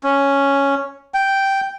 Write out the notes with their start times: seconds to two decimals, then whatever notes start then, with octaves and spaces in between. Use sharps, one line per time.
0.04 C#4
1.14 G5